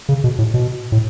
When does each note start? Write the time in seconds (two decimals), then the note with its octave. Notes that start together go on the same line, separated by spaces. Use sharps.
0.09 C#3
0.24 B2
0.38 A2
0.54 B2
0.92 A2